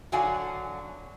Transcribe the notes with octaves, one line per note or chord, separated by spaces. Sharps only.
D3 F#3 D4 F#4 F5 G#5